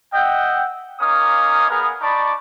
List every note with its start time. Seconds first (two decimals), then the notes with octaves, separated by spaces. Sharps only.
0.13 D#5 E5 F#5 G5
1.00 A#3 C#4 D#4 F5 D#6
1.69 B3 G#4 A#4
2.01 D#4 D5 A5 B5 C#6 D6